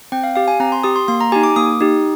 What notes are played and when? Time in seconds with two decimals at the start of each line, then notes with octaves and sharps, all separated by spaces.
0.12 C4 G5
0.23 F5
0.35 G4 F5
0.48 G#5
0.60 C4 A#5
0.72 C6
0.83 G4 D#6
0.96 C6
1.08 A#3 C6
1.21 A#5
1.32 D#4 G4 G#5
1.43 D6
1.56 A#3 D#6
1.80 D#4 G4